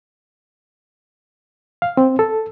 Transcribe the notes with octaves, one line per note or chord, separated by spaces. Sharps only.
F5
C4
A4